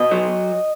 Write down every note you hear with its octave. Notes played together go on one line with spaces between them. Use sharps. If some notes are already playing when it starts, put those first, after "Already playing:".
Already playing: B2 D#5
F#3